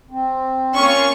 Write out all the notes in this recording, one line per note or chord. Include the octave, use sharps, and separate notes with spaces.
C4
A#3 C#4 F4 C#6